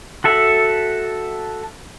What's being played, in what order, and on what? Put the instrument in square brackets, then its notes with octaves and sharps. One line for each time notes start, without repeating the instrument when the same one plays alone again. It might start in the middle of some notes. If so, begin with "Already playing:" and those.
[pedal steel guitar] F#4 A4 E5 F#5